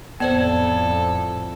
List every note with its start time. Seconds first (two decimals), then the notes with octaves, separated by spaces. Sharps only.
0.20 F2 A2 B3 A4 C5 D5 G#6